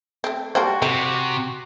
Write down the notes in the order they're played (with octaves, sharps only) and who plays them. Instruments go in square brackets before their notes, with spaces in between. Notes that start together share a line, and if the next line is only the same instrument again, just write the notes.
[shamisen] A3 C4
[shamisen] G3 A#3 D4 [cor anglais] F#4 [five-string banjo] C5 G5
[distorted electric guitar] C3 [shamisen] C4